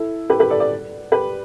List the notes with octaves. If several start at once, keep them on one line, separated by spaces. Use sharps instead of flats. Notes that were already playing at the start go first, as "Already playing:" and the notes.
Already playing: E4 A4
G4 B4
G4 B4
A4 D5
A4 D5
G4 B4